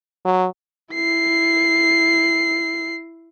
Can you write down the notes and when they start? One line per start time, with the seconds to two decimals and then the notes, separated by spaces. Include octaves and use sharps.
0.25 F#3
0.94 E4 C7